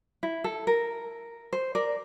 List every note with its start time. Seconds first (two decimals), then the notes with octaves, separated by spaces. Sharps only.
0.23 E4
0.44 A4
0.67 A#4
1.53 C5
1.75 A#4 D5